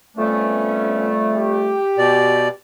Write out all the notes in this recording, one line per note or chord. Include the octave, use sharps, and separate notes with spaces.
F2 G3 A3 B3 C#4
G4
B2 D5